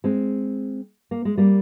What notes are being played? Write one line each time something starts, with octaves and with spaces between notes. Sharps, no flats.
G#3 C4
A#3
G#3
G3 A#3